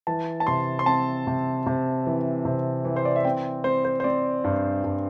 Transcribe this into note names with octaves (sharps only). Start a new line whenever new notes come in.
E3 A5
A5
C3 C6
C6
C4 A5
C3
C3
E3
C3
E3
C5
D5
E5
C4 G5
C4 C5
C5
C5
C4 D5
G2
G2